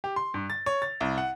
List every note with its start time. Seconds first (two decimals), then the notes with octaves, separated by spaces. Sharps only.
0.04 G4
0.16 C6
0.34 G2
0.50 A6
0.66 C#5
0.82 A6
1.01 C2
1.18 F#5